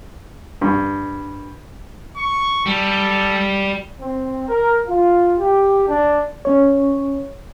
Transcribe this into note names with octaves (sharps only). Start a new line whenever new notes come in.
G2
C#6
G3 A4
C4
A#4
F4
G4
D4
C#4 C#5